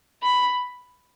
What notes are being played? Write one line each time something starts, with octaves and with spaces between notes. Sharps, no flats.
B5